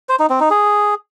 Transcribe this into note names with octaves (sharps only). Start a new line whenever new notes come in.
C5
D#4
C4
D#4
G#4